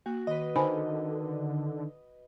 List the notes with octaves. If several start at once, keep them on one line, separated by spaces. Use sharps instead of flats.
A#3 F#4
D#3 B4 D#5
D3 D#3 C5 G#5 B5